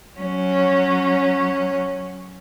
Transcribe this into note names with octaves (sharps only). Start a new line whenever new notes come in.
F#3 C#4